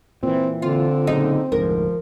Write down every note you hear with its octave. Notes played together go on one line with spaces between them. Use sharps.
A#2 E3 C4
D3 C4 F4
A#2 C#3 F#3 D#4
F1 D2 G#2 F3 A#4